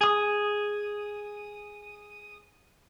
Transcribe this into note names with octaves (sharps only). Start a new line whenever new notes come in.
G#4 D#6